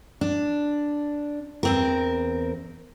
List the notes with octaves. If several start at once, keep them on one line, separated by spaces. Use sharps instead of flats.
D4
E2 C4 A#4